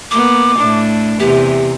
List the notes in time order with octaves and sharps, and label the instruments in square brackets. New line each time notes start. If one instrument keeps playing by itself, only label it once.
[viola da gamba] A#3 B3 [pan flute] D6
[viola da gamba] A2 D4
[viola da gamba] E2 C3 [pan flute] G4